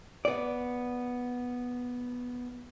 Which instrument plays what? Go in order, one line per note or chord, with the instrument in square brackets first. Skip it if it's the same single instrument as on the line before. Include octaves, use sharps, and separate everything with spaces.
[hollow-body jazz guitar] B3 D5